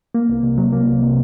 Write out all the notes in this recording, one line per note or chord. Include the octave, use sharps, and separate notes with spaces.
A#3
C2
C3
F#3
A#3
C2
C3